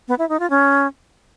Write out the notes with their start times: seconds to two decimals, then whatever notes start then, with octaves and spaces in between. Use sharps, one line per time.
0.08 B3
0.19 E4
0.29 D#4
0.40 F4
0.50 C#4